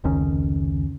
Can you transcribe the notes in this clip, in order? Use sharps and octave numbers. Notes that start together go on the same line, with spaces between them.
F1 C#2 D#3 C#4